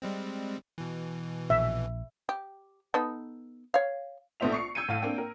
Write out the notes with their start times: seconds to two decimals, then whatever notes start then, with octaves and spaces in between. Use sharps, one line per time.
0.02 G3 G#3 C4
0.78 B2 E3
1.50 A#1 E5
2.29 G4
2.94 B3 D#4 A4
3.74 C#5 F5
4.40 A#1 A3 B3 C5 E5 F7
4.52 C#6 C7 C#7
4.75 E6 G6 G#6 C#7 D#7
4.89 A2 F5 D#7
5.02 A#3 C4 D4 G5
5.18 A#4